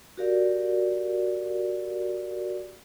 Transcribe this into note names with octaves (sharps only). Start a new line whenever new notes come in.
F#4 G4 A#4 D5 F5